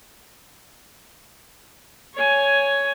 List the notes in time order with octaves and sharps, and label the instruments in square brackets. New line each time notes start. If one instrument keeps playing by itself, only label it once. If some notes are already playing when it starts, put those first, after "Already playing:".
[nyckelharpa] C#5 G#5